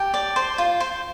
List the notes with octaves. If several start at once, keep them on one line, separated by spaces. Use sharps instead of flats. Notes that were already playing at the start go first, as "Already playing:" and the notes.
Already playing: G4 A5
D5
C5
F4
C5